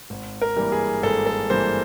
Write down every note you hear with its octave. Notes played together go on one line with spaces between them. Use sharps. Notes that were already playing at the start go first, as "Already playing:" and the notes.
G#1
A#4
G2 E3 G3 A#3
G#4
G#1 A4
A4
G2 E3 G3 A#3 C5